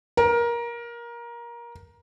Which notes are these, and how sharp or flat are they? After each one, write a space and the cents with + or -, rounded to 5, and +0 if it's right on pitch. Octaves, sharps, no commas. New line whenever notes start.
A#4 +20